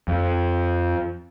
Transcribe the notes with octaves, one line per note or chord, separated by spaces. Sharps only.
F2